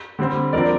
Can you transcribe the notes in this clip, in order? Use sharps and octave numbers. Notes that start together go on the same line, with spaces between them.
D3 G3 C4
D3 F3 C4 A#4 D5